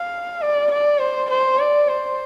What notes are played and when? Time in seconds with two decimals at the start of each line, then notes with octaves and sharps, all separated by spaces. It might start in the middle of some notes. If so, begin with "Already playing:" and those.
Already playing: F5
0.42 D5
0.71 D5
1.01 C5
1.30 C5
1.59 D5
1.88 C5